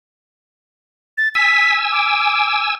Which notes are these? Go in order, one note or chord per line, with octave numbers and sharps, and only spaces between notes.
A6
G#5 E6 B6
D6